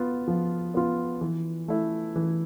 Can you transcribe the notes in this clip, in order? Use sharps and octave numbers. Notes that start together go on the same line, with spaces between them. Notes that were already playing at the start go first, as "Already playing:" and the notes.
Already playing: B3 F4
F3
B3 F4
E3
A3 E4
E3